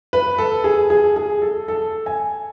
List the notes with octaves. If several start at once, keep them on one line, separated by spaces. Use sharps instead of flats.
B4
A4
G#4
G#4
G#4
A4
A4
G#5